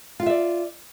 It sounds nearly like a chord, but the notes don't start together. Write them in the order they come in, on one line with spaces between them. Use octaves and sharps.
F4 F5 E5 D5